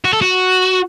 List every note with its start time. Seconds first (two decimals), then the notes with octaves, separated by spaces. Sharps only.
0.05 F#4
0.13 A4
0.22 F#4